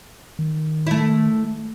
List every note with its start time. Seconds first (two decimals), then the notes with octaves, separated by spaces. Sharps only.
0.39 D#3
0.87 A3 E4